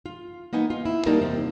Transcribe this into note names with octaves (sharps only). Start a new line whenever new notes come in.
F4
A#3 B3 D#4 G#5
F4
E4
G3 A#3 D#4 A#4 A5
E2 C3 F3